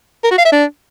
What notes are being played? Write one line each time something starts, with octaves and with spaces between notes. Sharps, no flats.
A#4
F#4
F5
E5
D4